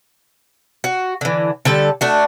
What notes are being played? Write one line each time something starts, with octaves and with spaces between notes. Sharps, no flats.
F#4
D3 E3
D3 G3 A4
A3 D4 F#4